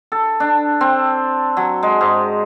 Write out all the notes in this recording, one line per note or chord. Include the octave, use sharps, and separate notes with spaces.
A4
D4
C4
F#3
G#3
G#2